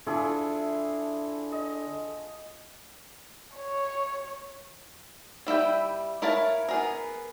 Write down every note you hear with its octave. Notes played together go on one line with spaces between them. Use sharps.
D3 F3 E4 G#4
D#5
C#5
G3 E4 E5 G5
E4 A#4 C#5 F5 A5
B3 G#4 A#4